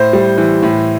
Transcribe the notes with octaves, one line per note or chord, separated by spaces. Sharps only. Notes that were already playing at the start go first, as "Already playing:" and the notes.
Already playing: A2 C5
G3
E3
A2